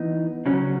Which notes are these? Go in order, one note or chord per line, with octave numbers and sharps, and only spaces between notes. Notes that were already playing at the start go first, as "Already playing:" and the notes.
Already playing: E3 B3 D#4
C#3 F#3 C#4